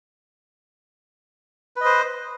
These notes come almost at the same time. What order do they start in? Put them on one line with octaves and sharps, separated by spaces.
B4 D#5 C5